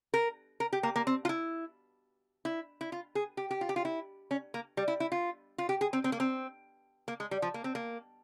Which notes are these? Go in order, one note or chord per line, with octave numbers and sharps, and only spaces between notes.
A#4
A#4
G4
A#3
A#3
C4
F4
E4
E4
E4
F4
G#4
G4
G4
F4
G4
F4
E4
C#4
A#3
G3
E4
E4
F4
F4
G4
G#4
C4
C4
A#3
C4
A#3
G#3
G3
F3
A#3
C4
A#3